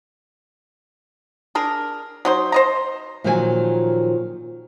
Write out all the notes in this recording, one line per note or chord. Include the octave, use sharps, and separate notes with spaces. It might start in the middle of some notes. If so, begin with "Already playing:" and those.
D4 G#4 A#4
F#3 D#4 C5
C5 D#5 A#5
A#2 D#3 F3 F#3 G#4 G#5